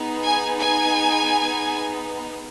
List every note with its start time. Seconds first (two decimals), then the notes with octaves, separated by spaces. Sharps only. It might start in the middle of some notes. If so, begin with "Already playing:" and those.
Already playing: B3 D#4 G#4
0.23 G#5
0.58 G#5